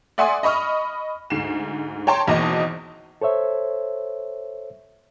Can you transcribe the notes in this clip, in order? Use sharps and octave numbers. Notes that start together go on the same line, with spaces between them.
D5 E5 F#5 G#5 C6 D#6
D#5 B5 C#6 D#6 F6
D2 G#2 C7 E7
C#5 G5 A5 A#5 C6
G#1 E2 B2 A#3 D#5 A5
A4 C5 C#5 E5